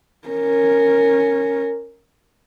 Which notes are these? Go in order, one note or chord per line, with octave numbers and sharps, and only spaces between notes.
C#4 A#4